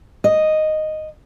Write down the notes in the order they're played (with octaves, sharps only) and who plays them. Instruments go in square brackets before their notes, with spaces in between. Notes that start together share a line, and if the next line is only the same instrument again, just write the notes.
[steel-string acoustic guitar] D#5